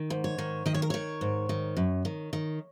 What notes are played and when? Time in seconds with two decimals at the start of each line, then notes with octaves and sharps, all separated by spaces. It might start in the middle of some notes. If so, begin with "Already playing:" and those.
Already playing: D#3
0.10 G#2
0.24 C#5
0.38 D#3
0.66 D#3 D#5
0.74 C#5
0.82 A#4
0.90 D#3 C#5
1.21 G#2
1.49 D#3
1.77 F#2
2.05 D#3
2.33 D#3